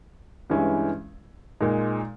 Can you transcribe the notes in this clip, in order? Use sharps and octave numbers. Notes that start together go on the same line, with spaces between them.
G2 E3 G#3 C#4 E4
A#2 G#3 D#4